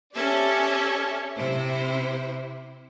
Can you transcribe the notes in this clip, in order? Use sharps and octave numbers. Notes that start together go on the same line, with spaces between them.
C4 C#4 G4 A4 D5 E5
C3 E4 C5